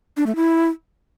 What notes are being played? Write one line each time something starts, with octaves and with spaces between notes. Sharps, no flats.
D4
A3
E4